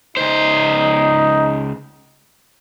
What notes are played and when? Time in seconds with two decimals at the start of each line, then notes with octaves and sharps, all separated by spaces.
0.17 C#2 D#4 C5